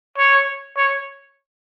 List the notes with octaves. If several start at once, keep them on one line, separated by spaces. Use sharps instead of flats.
C#5
C#5